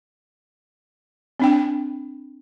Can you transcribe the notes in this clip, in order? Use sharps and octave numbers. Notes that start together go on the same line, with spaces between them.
C4 D4 G5